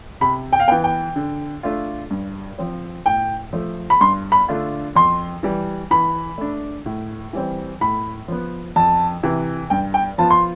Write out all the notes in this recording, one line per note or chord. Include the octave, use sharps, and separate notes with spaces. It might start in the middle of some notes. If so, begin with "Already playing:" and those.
C3 B5
G5
F5
E3 B3 G5
G5
D3
A3 D4 F4
G2
F3 C4
A2 G5
F3 A3
B5
G2 C6
B5
D3 A3 D4 F4
F2 C6
E3 G3
E3 B5
A3 D4
A2
E3 G3 C4
A2 B5
F3 B3
F2 A5
C3 E3
G2 G5
G5
F3 B3 F4 A5
C6